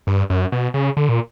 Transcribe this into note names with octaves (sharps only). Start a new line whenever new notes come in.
G2
F#2
B2
C#3
D3
A#2